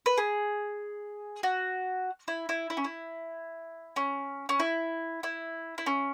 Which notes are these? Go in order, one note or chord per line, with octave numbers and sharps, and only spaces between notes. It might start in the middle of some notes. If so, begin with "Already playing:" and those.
B4
G#4
F#4
E4
E4
E4
C#4
E4
C#4
C#4
E4
E4
E4
C#4